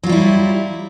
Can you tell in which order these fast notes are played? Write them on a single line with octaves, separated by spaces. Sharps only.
F#3 F4 G3 E4